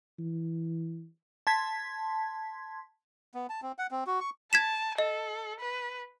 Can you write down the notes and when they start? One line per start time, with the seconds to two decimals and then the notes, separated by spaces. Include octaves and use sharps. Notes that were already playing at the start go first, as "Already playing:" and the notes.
0.19 E3
1.47 A5 C6 G#6 B6
3.35 B3
3.50 A5
3.62 C4
3.78 F#5
3.91 C4
4.07 F#4
4.20 C#6
4.53 A5 G#6 B6 E7
4.98 A4 D#5
5.61 B4